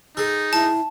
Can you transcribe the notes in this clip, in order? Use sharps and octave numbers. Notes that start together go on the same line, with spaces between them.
D#4 G#4 A4
E4 A5